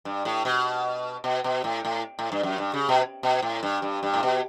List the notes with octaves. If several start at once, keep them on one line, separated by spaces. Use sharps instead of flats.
G2
A2
B2
B2
B2
A2
A2
A2
G2
F#2
G2
C#3
B2
B2
A2
G2
G2
G2
A2
B2